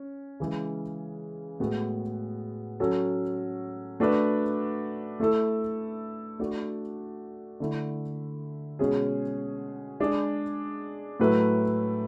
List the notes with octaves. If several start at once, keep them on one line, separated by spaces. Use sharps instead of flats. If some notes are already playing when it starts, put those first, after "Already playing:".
Already playing: C#4
C#3 E3 G#3
A2 G#3 B3 F#4
F#3 C#4 F#4 A4
A3 D4 F#4 B4
A3 E4 A4
A3 D4 F#4
D3 A3 E4
B2 G#3 C#4 G#4
G#3 D4 G#4
A2 F#3 A3 E4 B4